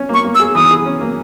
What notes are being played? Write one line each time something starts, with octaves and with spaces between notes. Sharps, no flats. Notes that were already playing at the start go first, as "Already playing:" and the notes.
Already playing: C#4
A#3 C#6
A#3
E6
G#4
E3 D#6
G#4
C#4
A#3